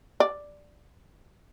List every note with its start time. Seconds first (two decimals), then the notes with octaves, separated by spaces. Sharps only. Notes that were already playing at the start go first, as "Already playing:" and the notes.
0.20 D5